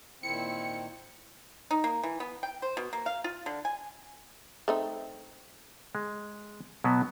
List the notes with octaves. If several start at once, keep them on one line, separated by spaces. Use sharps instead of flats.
A#2 D#3 C4 E4 C#7
D#4
A#3
E3
B3
G5
C5
B2
A#3
F5
F4
D3
G#5
A3 C4 D#4
G#3
B2 F#3 B3